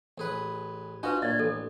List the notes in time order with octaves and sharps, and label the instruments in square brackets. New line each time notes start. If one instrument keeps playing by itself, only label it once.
[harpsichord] A1 G#4 B4
[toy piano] D4 B4 [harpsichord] F4 F#4 D#5
[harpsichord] A#2 [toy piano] D5 D#5
[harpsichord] A1 [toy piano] A4